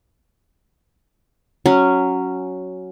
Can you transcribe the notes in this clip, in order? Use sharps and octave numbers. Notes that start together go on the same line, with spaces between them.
F#3 C#4